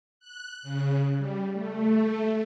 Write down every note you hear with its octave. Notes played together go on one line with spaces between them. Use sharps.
F#6
C#3
G3
A3